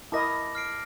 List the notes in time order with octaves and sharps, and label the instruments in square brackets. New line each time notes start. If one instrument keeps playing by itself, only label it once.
[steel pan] E4 A#4 D#5 [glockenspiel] A5 D6 A#6
[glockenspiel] F6 C7 D7